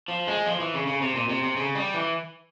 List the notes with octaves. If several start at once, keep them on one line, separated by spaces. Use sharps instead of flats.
F3
G#3
F3
E3
C#3
C#3
C3
A#2
C3
C3
C#3
G3
E3